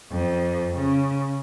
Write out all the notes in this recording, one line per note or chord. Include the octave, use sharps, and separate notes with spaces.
F2
C#3